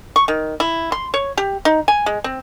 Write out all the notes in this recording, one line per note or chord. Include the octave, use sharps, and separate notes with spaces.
C#6
D#3
E4
C6
C#5
G4
D#4
G#5
G#3
C4